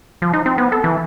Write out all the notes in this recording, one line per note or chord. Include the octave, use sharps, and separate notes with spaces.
F3
D#4
C4
B3
A4
E3